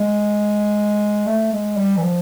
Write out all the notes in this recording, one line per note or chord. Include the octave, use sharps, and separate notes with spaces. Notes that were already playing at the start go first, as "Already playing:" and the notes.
Already playing: G#3
A3
G#3
G3
E3
F3